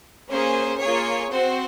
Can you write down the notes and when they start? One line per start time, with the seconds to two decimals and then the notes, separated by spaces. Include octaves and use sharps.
0.30 A#3 C#4 G#4 C5
0.80 A#3 F4 G#4 C#5
1.31 C4 F#4 C5